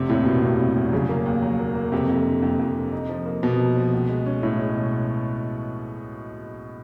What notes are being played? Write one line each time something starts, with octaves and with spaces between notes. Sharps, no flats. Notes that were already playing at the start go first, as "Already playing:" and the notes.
Already playing: F1 C3
D#2 A2
B2 D#3
D#2 C3
G3
F1
C#3 F#3
A#3
D#2
F#3
A#3
A#3
F2 C3
F2
D3
F2
F2
D3
D#4
F3
A#3
B2 F3
D#4
F3
C#2
G#3
C#4
A2 C#4
G#3
B2